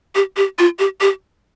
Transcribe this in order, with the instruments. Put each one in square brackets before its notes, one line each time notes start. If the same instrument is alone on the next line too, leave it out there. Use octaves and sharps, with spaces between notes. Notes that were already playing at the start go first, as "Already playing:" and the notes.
[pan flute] G4
G4
F4
G4
G4